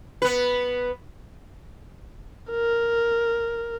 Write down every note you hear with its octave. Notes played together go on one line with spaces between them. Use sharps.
B3 B4
A#4